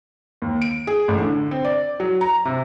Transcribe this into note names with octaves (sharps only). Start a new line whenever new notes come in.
D#2
D7
G#4
A1
D3
C4
D5
F#3
A#5
C3